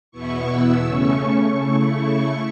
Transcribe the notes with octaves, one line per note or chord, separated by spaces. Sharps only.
E2 B2 B3 E4 C#6
E6
C#3 A3 C#4 C#6
C#3 A3 E4